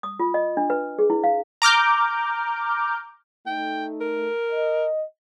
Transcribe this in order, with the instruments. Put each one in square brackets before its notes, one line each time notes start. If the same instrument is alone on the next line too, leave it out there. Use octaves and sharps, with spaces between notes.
[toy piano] D#6
F4
D#5
D4
B4
G#4
E4
F5
[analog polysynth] A#5 D6 F6 G6
[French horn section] A3 D#4 [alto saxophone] G5
[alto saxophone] A#4
[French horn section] D#5